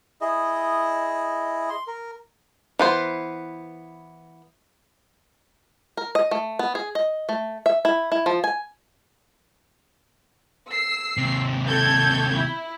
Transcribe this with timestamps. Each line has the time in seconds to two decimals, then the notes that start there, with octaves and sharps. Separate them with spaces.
0.21 E4 G#4 D#5
1.70 C6
1.87 A#4
2.79 E3 B3 C5
5.97 A#4
6.15 D#5
6.31 A3
6.59 B3
6.75 G#4
6.95 D#5
7.29 A3
7.66 E5
7.85 E4
8.12 E4
8.26 F3
8.44 G#5
10.69 E6 C7
11.17 D#2 C3
11.68 A4 G6 G#6
12.33 E4